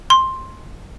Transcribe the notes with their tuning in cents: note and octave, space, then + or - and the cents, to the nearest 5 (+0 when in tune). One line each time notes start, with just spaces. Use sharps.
C6 +10